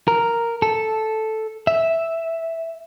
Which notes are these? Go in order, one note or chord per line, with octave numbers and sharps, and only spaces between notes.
A#4
A4
E5